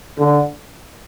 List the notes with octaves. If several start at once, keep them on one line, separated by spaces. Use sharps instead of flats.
D3